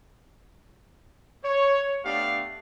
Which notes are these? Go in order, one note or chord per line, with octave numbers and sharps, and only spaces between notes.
C#5
A3 B3 D4 G4 F5